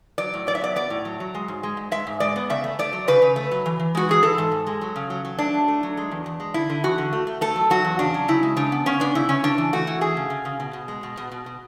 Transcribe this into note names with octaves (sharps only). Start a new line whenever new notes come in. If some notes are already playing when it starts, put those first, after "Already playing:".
F#3 D5
A2
F#3 D5
E5
B3 D5
B3 D5
A2
F#3
F#3
G#3
G#2
G#3
G#2
G#3 E5
G#2
G#3 D5
B3
C#3 E5
A3
A3 D5
F#3
C#3 B4
C#3
A3
F#3
E3
E3
G#3 F#4
E3 G#4
E3 A4
G#2
G#2
G#3
F#3
C#3
F#3
F#3
A3 D4
A3
A3
F#3
G#3
E2
E2
G#3
D3 E4
D3
E2 F#4
D3
A3
A3
A3 A4
F#3
F#3 F#4
E2
C#3 D4
F#3
C#3 E4
G#3
C#3 D4
B3
C#3 C#4
B3 D4
C#3 E4
C#3 C#4
C#3 D4
E3
A3 F#4
E3
A3 G#4
C#3
C#3
C#3
B2
B2
G#3
B2
B2
B2
B2